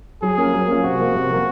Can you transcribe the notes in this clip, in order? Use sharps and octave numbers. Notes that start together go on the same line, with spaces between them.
F#3 G#4
A#3 C#4 F4
F#3
A#3 C#4 F4
C3 F#4
F3 A#3
C3
F3 A#3